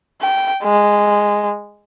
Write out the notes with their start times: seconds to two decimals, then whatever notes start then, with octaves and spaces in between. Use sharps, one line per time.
0.21 G5
0.63 G#3